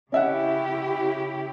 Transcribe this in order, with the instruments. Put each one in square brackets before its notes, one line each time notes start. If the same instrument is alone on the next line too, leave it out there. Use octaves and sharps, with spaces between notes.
[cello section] C#3 E4 G4 [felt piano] C#4 E5 F#5